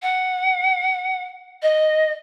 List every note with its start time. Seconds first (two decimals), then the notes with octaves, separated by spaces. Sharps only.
0.02 F#5
1.62 D#5